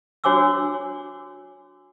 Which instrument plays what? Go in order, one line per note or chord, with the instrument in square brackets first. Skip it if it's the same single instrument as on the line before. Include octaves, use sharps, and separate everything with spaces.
[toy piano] D4 F#4 C#5 G#5 D6 E6